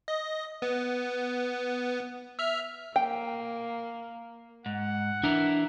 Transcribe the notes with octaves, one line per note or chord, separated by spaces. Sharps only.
D#5
B3
E5 F6
A#3 G5
G#2 F#5
E3 D4 E4 A#4